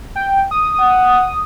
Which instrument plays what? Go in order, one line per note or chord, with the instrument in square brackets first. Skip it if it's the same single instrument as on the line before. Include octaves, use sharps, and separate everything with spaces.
[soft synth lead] G5
D#6
[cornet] F#5